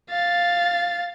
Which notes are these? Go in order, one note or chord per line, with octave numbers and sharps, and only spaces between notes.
F5 A6